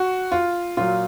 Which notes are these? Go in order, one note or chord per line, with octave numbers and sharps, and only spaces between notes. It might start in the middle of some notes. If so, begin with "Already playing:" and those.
Already playing: F#4
F4
A#2 F#3 F4